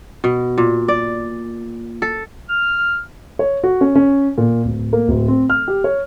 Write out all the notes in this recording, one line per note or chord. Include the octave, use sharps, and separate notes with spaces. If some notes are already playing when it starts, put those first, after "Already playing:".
B2
A#2
D5
A4
F6
C#5
F#4
C#4
C#4
A#2
D1
A#3
D1
C4
F6
G4
C#5